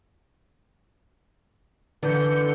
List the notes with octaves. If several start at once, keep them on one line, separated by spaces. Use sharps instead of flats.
D3 E3 G6 C#7